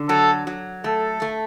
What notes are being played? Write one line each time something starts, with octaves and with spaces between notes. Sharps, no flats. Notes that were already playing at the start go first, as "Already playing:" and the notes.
Already playing: D3
F#3 A4
F#3
A3 A4
A3